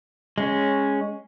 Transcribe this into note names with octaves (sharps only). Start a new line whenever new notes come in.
G#3 C#4